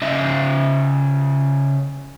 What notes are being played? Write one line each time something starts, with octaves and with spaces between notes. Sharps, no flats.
C#3 D#5 E5